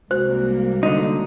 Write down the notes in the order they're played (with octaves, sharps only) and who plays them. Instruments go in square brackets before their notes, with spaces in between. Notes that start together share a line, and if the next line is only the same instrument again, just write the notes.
[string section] C2 A#3 [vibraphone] G#3 F#4 [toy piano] C5
[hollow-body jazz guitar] D3 D#4